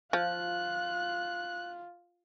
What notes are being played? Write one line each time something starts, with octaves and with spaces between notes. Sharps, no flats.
F3 F4 F#6